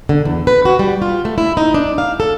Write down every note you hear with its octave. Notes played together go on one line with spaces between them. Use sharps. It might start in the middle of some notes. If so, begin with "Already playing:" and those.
D3
E2
B4
F#4
G3
F4
A3
E4
D#4
D4
F5
A4